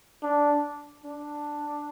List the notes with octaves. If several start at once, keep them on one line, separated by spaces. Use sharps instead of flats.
D4
D4